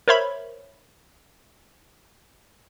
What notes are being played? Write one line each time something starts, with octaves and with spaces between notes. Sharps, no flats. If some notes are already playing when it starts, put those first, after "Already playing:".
A#4 C5 C#5 E5 B5